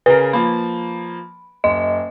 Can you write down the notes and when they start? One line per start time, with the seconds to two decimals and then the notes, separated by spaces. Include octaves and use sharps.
0.06 C#3 A#4 B4
0.33 F3 A#3 B5
1.64 F#1 D#5